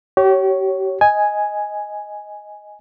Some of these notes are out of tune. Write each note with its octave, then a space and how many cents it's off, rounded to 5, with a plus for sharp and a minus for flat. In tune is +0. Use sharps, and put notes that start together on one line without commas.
G4 -35 C#5 +0
D#5 +5 G#5 +0